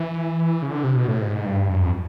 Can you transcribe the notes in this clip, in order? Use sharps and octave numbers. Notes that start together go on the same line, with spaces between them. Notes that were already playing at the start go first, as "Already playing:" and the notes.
Already playing: E3
C#3
D3
C3
B2
A2
G#2
G2
F#2
F2